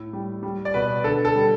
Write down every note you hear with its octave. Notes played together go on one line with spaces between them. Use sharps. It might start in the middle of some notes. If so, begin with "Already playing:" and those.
Already playing: A2 A3
G3
G3
D5
B2 B4
D3 A4
A4
G3